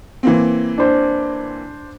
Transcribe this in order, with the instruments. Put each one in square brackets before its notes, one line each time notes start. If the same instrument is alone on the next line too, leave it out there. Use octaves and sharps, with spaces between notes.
[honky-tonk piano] E3 A#3 C4
[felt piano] D4 C5